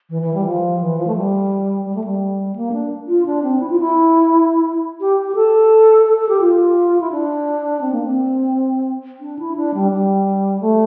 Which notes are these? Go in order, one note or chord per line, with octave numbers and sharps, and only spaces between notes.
E3
E3
G3
F3
E3
F3
A3
G3
G3
A3
G3
A#3
D4
F4
D4
C4
E4
F4
E4
G4
G4
A4
A4
A4
G4
F4
E4
D4
C4
A#3
C4
D4
E4
D4
G3
G3
A3